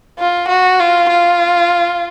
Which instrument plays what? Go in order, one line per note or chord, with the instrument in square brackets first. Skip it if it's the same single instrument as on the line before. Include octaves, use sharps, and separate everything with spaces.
[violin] F4
F#4
F4
F4